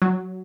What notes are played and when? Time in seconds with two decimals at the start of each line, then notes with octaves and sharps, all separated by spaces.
0.02 F#3